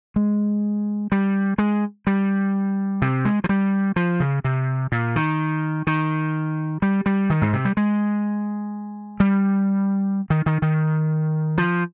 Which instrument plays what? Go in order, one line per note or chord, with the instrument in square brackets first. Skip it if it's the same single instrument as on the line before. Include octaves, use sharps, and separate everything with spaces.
[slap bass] G#3
G3
G#3
G3
C3
G#3
F3
G3
F3
C#3
C3
A#2
D#3
D#3
G3
G3
D#3
G#2
C3
G3
G#3
G3
D#3
D#3
D#3
F3